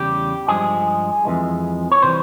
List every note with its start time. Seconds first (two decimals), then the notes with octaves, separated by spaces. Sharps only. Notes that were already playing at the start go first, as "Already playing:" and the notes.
Already playing: E2 C#3 G3 G4
0.48 G2 F3 G#3 G#4
1.25 F2 E3 G#3
1.92 C#5
2.03 C3 E3 G3 C5